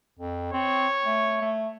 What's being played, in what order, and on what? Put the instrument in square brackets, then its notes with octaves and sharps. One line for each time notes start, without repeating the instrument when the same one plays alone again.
[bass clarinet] F2
[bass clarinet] C4 [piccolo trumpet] C#5
[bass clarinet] A3
A3